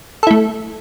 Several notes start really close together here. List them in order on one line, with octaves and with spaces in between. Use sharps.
A4 E4 A3